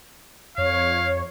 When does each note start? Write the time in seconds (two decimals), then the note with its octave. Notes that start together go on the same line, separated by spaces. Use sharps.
0.58 F2 C#5 F5